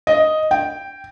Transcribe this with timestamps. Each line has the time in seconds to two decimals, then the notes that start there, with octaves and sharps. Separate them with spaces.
0.07 D#5
0.51 G5